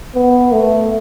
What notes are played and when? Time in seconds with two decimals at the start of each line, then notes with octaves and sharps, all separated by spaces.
0.15 B3
0.52 A3